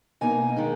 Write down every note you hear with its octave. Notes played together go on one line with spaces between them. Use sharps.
B2 A#3 D#4 G#5
D#3 G#3 D#4